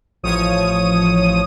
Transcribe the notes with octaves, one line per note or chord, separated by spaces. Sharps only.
A1 F3 C#5 D#6 D#7